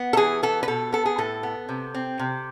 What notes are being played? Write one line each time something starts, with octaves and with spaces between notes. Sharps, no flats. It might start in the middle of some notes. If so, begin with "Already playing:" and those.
Already playing: B3
A4
E3 G#4
B3 A4
B4
B2 A4
B3 A4
G#4
A2 A4
B3
C3
C4
C3